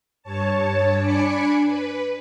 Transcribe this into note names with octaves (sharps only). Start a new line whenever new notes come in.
G2 C#5 A5
D4 G#5 B5 D6 C#7
B4